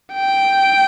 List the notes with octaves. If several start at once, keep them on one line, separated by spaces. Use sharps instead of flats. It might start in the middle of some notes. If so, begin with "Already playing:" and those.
G5